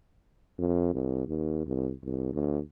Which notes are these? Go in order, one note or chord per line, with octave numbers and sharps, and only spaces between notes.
F2
C2
D#2
C2
C2
D2